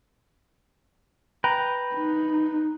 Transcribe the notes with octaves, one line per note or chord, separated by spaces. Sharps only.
B4 G5 A#5
D#4